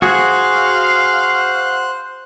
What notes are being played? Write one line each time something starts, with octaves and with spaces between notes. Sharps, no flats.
F#4 G#4 C5 F5 F#6